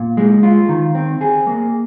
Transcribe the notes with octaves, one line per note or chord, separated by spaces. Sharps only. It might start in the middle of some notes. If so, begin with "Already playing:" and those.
Already playing: A#2
G#3
F4
D#3
C4
G#4
A#3